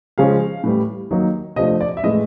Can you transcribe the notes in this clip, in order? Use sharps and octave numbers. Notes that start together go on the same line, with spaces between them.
C#3 F3 G#3 C#4 F5
A2 E3 G3
D#3 F#3 A#3 D#4
C3 F3 A3 D4 D#5
D5
E5
A2 E3 G#3 D#5